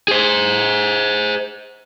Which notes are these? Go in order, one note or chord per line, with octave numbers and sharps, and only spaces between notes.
G#4 C5